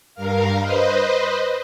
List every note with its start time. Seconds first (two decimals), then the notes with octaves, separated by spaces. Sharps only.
0.15 G2 A#4 F5
0.58 B4 C5 D#5